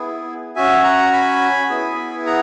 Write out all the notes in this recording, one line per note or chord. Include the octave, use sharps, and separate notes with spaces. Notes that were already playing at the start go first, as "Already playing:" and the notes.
Already playing: B3 E4 G#4
C#4 F#4 E5 G#5
F#5 A#5
G#5 B5
B3 E4 G#4
F#5 A#5